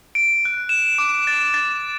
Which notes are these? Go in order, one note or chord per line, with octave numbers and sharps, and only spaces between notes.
D7
F#6
E7
D6
A6
A6